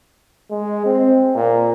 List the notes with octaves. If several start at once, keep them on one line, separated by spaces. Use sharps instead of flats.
G#3
C4
A#2